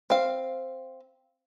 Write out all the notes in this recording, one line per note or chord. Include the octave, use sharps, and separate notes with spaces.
C4 F5